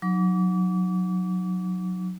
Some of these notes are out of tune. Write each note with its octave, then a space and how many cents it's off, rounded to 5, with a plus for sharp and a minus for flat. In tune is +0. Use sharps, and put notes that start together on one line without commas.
F#3 -20 D#4 +0 D6 -35